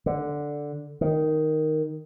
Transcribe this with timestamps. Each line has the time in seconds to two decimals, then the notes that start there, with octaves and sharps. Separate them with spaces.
0.06 D3
1.01 D#3